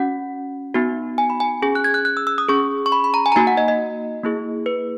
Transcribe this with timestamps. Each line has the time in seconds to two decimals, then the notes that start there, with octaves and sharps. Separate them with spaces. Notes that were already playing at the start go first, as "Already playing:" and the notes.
Already playing: C#4 F#4 F#5
0.75 B3 D#4 F#4
1.18 G#5
1.30 B5
1.40 G#5
1.62 C#4 G#4 G#5
1.75 F#6
1.84 G#6
1.94 F#6
2.05 F#6
2.17 E6
2.27 E6
2.38 D#6
2.49 C#4 G#4 C#6
2.86 C#6
2.92 B5
3.04 B5
3.14 A#5
3.26 G#5
3.32 A#5
3.36 A#3 D#4 F#4 G#5
3.47 F#5
3.57 D#5
3.68 D#5
4.24 A#3 E4 G#4
4.66 B4